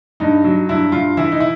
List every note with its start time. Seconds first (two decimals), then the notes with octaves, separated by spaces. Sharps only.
0.20 G2 D#4
0.44 F#3
0.69 G2 E4
0.92 G2 F4
1.17 E3 E4
1.32 D#4
1.40 E4